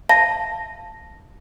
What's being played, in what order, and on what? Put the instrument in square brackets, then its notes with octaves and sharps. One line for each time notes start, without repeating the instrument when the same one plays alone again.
[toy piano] F5 A5 [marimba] A#6